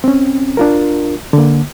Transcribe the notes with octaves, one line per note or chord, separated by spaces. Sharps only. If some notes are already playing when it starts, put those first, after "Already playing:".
C4 C#4
D4 F4 A#4
D3 A#3